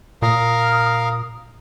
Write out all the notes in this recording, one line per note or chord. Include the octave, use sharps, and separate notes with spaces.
A#2 A#4 F5 D#6